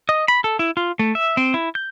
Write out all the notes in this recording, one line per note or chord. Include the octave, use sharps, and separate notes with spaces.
D#5
B5
A4
E4
F4
A3
E5
C4
E4
G6